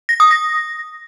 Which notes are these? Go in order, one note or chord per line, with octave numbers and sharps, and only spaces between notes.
A#6
D#6
A#6